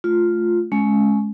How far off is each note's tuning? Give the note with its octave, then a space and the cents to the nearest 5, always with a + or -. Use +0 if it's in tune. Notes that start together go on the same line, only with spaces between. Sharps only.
A3 -15 F4 +0
G#3 +25 C#4 +0